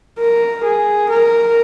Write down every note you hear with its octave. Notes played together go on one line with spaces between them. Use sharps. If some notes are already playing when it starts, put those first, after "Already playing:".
A#4
G#4
A#4